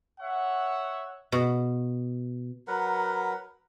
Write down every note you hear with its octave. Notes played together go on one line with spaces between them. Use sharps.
C#5 E5 F#5
B2
F#3 A#4 B4 F#5